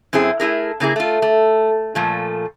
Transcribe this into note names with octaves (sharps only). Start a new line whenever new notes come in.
F#2 C4 E4 G#4
A3 E4 G#4 A#4
C#3 A#3 E4 G#4
A3 F4
A3
A#2 F3 A3